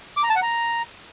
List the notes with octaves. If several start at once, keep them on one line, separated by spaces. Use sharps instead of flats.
D6
A#5
A5
F#5
A#5